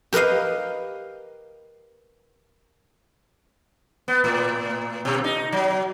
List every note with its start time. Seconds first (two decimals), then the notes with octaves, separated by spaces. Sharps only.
0.13 G4 A#4 B4 D#5 F5
4.08 B3
4.24 A2
5.05 B2
5.24 D#4
5.53 F#3